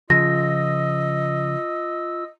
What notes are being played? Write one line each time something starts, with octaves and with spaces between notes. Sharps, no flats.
C#3 F3 F4 D#5 E6 A#6